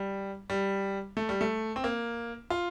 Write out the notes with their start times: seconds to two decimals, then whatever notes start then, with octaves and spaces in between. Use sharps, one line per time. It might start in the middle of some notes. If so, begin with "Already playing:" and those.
Already playing: G3
0.50 G3
1.17 A3
1.29 G3
1.41 A3
1.76 C4
1.84 A#3
2.50 F4